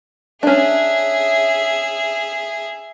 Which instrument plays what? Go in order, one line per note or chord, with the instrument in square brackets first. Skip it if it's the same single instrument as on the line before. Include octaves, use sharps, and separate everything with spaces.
[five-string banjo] C#4 D4 [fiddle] G#4 E5